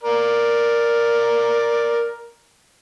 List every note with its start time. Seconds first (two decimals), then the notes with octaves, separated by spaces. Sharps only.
0.03 A#4 D5